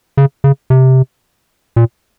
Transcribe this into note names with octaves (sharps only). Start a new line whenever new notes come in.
C#3
C#3
C3
A#2